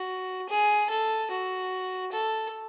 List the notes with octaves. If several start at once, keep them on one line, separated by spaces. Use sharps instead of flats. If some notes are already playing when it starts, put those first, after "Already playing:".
Already playing: F#4
G#4
A4
F#4
A4